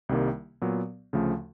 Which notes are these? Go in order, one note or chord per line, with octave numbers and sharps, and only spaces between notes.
C2 C3 D#3 G3 A#3
A#2 F#3 B3
D2 C#3 F3 A3